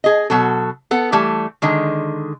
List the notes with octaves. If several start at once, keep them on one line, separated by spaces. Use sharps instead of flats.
G#4 D#5
B2 F#3 F#4 A4
B3 A4 F#5
E3 G3 A3
D3 D#3 G#3